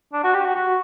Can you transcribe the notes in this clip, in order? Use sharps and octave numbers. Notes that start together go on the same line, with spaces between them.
D4
F#4
G4
F#4
F#4